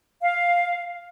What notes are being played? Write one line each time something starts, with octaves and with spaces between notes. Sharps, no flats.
F5